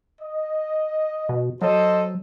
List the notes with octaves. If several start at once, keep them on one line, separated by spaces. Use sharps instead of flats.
D#5
B2
F#3 A4 C5 D#5